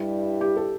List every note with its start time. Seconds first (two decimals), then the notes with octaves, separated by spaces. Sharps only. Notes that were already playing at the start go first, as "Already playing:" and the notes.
Already playing: G2 G3 E4
0.41 G4
0.57 A4